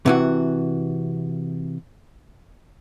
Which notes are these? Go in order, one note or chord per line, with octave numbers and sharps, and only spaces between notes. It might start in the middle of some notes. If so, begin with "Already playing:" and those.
C3 E3 F#4